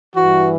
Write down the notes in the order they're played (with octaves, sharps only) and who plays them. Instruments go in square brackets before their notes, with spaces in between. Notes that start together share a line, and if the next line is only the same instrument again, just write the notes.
[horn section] G2 E3 F#4